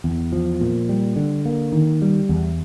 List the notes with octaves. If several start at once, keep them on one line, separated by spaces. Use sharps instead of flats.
E2
F3
A#2
G3
D3
A#3
D#3
G3
E2